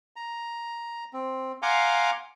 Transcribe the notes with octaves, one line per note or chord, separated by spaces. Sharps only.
A#5
C4
F5 F#5 G#5 A#5 C6 D6